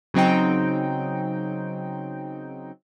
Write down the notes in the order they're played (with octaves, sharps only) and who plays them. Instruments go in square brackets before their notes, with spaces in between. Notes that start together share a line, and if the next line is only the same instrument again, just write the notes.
[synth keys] C#3 F#3 C4 D#4 G5